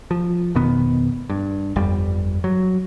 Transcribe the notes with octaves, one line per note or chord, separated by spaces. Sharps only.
F3
F1 B2 D#3 B3
G2
G1 F2 G3
F#3